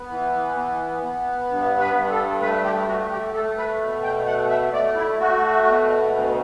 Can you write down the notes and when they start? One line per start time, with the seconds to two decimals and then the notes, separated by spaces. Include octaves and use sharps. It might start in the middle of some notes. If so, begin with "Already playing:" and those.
Already playing: B3
0.10 E3
0.57 B3
1.03 B3
1.49 G2
1.80 B4
1.95 G2
2.11 A4
2.41 A3 B4
2.65 G4
2.88 A3 F#4
3.11 G4
3.34 A3 A4
3.58 B4
3.81 B2
4.03 G5
4.27 A3 F#5
4.50 E5
4.73 A3 D5
4.96 E4
5.19 A3 F#4
5.66 B2
6.12 D2